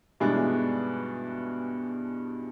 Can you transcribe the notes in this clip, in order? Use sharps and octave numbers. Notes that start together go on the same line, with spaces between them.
G2 B2 E3 G#3 D4 D#4